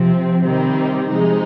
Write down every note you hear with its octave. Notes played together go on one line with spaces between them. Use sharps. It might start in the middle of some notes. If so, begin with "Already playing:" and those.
Already playing: C3 F3 C4
C3 D#3 G3 C4 D#4
C3 F3 G#3 D#4